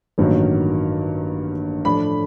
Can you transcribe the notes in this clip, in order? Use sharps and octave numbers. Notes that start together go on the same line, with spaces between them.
A1 G2 D#3 F#3 A#3
A2 F3 A3 D4 B5